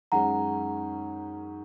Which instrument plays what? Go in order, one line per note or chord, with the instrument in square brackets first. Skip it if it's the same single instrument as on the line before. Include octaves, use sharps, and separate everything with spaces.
[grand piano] F#2 D#3 G#3 C#4 G#4 [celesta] F#5 A#5